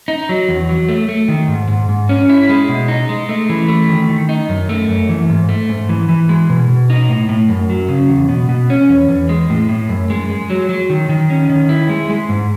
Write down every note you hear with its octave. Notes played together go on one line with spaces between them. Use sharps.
D#4
F#3
E2
F#3
A3
A3
D#3
G#2
G#2
G#2
C#4
E4
G#3
B2
D#4
G#3
A3
E3
A3
D#3
D#3
D#4
F#2
A3
F#2
E3
G#2
A3
G#2
E3
E3
G#3
B2
B2
D#4
A2
A2
F#2
F#3
C#3
E2
B2
B2
C#4
E2
E2
G#3
A2
A2
F#2
G#3
G#3
F#3
F#3
D#3
D#3
C#4
D#3
E4
G#3
G#3
G#2